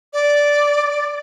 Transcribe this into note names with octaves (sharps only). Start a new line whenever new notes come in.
D5